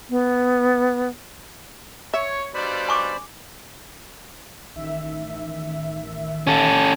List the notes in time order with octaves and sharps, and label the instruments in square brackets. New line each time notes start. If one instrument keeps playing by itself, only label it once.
[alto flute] B3
[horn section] C#5 [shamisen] E5
[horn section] G2 B2 G3 [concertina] C5 D5 B5
[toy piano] G#5 C#6 D6
[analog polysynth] A1 D#3 E5
[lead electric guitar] C#4 A4